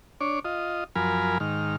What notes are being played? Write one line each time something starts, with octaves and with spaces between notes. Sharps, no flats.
D4 C#5 D6
F4 D#5
F#2 F3 A#4 G#5 B5 F6
G#2 D#3 F6